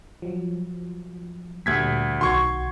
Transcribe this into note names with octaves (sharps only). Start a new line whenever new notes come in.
F3 F#3
D2 A#2 G3 G#6 B6
B1 D#3 F#4 C6 C#6 G#6